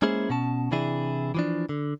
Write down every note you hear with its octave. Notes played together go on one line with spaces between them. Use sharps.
G#3 A#3 C#4 E4 G#4 C5
B2 C#4 A5
C3 E3 D4 E4 G#4
E3 F3 D4
D3